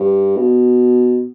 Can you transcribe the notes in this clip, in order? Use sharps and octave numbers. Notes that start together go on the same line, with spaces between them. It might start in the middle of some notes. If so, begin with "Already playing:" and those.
Already playing: G2
B2